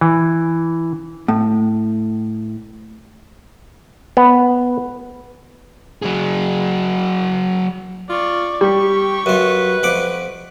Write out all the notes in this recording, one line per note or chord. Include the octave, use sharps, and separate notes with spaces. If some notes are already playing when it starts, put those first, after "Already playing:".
E3
A2
B3
F#3 G#4
F4 D5 C#6
G3 G4 C#6
F#2 F4 B4
F2 F#5 D6